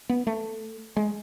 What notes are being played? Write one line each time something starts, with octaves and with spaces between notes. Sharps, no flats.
B3
A3
G#3